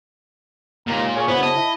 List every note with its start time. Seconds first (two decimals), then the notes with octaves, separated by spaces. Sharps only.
0.87 D#2 A#2 G#3 A#5
1.15 G#4 A#4 C#5
1.28 F#2 C#3 B3 E4 C5
1.43 D#5 A5
1.56 E4